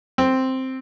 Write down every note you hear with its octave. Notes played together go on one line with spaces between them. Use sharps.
C4